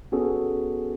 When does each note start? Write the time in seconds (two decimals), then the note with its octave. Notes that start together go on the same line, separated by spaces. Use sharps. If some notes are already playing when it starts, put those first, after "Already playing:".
0.12 B3 C#4 F#4 G#4 A4